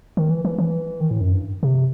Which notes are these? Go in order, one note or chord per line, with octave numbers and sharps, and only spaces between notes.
D#3
E3
E3
E3
D#3
A2
F#2
G2
C3